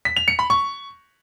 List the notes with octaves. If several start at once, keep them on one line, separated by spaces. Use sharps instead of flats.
B6
F7
C#7
B5
C#6